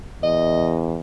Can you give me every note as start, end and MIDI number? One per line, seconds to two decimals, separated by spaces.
0.23 1.00 40
0.23 0.72 75